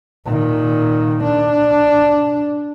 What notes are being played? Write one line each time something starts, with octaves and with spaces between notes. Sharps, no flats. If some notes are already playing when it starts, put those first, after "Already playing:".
A#2 D#3
D4